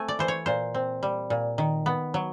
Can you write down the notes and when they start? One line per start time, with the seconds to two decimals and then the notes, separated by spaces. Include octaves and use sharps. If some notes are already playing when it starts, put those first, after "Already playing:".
Already playing: A3 C4 G#5
0.08 D5
0.19 E3 C5
0.28 C#5
0.46 A#2 C5
0.74 C4
1.03 G3
1.30 A#2
1.58 D#3
1.86 B3
2.14 F#3